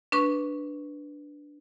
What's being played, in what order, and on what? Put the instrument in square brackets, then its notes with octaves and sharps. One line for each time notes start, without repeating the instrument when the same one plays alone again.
[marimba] D4 B4 C#6